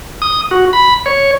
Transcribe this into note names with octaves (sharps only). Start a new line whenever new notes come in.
D#6
F#4
B5
C#5